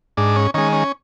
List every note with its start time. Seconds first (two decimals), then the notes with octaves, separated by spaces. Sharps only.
0.17 G#2 D4
0.36 C#4
0.54 D#3 G#3 C#4
0.73 C#4